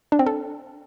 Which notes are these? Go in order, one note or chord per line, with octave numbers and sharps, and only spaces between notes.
D4
C4
A4